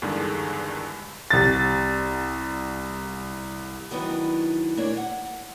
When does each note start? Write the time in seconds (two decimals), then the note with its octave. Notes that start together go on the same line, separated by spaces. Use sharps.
0.02 E2 G2 D3 D#3 G#3 D4
1.30 C2 A6
3.91 D#3 E3 F#3 B3 D4 D#4
4.76 D2 A#2 A3 A#3 D4 C#5
4.97 F#5